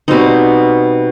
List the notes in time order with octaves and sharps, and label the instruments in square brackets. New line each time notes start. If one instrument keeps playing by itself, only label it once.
[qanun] B2 G3 C4 D#4